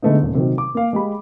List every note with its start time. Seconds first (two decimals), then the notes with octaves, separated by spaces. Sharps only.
0.02 D3 G#3 A3 B3 D#4
0.22 D#1
0.34 C3 D#3 F#3
0.58 D6
0.75 A#3 F5
0.93 G#3 G4 B5